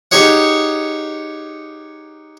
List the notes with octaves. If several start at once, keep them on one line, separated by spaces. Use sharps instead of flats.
D#4 G4 G#4 C#5 F#5